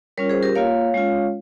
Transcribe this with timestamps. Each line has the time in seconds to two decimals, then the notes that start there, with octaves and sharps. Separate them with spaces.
0.18 G3 C#4 F4 A#4 C#5
0.29 G#4 C5
0.43 G4 A#4
0.55 A#3 F4 C#5 F5
0.94 G#3 C#4 F4